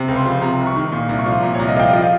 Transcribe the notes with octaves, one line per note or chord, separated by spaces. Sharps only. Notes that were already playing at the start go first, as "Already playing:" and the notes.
Already playing: C3
C#2
C6
F3
C6
C3 A#5
C2
C#6
D#3
A#2
C2
C#6
F3 C6
A#2 A#5
C2 C#5
D#5
F3 G5
F5
F3 D#5
F5